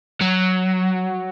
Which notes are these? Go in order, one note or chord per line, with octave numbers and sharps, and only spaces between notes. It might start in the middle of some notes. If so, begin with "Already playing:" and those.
F#3